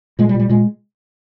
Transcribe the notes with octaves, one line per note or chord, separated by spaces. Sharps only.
A#2 G#3
G3
A#2
G3
A#2 G#3